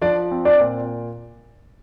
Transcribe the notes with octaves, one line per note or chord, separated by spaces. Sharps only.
F3 D4 D5
C4
D4 D5
A#2